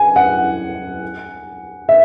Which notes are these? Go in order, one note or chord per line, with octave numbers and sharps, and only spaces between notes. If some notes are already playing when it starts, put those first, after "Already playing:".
Already playing: G#5
F#5
E5